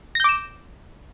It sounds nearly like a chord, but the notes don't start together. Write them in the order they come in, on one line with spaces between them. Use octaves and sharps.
A#6 G6 D6 E7